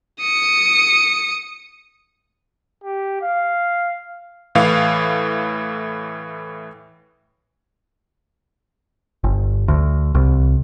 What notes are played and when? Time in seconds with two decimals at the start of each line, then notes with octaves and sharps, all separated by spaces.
0.20 D#6 C#7
2.84 G4
3.22 F5
4.55 A2 E3 F5
9.24 G1
9.68 D2
10.15 C2